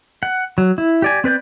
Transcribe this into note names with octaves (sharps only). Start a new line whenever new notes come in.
F#5
F#3
E4
G4 D5 G#5
C4 B4 D5 G6